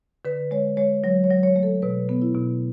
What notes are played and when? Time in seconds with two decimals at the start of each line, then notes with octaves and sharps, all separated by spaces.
0.25 D3 B4
0.51 G#3 C#5
0.77 G#3 C#5
1.04 F#3 C#5
1.24 C#5
1.30 F#3
1.43 C#5
1.56 A3
1.63 A4
1.82 B2 B4
2.09 B3
2.22 E4
2.35 B2